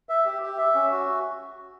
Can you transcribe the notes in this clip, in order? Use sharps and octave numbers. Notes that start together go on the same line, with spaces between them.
E5
G4
G4
E5
C#4
F#4